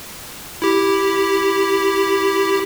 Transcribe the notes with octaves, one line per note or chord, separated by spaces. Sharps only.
E4 G4